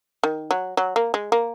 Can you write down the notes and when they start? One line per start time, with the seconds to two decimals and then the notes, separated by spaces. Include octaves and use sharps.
0.24 D#3
0.51 F#3
0.77 F#3
0.96 A#3
1.14 G#3
1.32 A#3